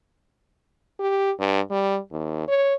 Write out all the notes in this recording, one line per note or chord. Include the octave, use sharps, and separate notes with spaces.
G4
G2
G3
D#2
C#5